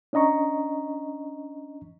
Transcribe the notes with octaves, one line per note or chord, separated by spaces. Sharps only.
C#4 D4 D#5 A#5 C#6